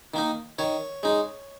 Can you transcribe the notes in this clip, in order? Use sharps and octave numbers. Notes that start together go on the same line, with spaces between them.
D#3 A#3 D#4
D#3 C#5
G#3 D#4